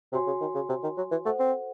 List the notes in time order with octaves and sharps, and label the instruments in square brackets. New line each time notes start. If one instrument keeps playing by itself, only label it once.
[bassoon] C3 [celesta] F#4 C#5 G#5 C6
[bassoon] C#3
D#3
C#3
C3
D#3
F#3
E3
[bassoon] A3 [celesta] A4 C5 F#5
[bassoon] C4